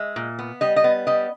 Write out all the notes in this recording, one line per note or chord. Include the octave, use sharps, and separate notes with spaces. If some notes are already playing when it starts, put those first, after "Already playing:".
Already playing: G#3 E5
A#2
B3
G3 D#5
D#5
B3
G3 D#5